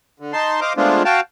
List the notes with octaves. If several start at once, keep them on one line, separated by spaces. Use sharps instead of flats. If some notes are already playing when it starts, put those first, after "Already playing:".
D3
D#4 A5 C6
C5 D#5 F5 D6
G#3 A3 B3 C4 D4 F4
F#4 F5 G5 A5